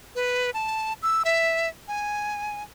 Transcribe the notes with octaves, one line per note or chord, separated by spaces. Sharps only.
B4
A5
E6
E5
G#5